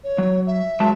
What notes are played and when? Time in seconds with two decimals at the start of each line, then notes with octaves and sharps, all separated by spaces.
0.04 C#5
0.18 F#3
0.47 E5
0.80 F#3 G#3 A5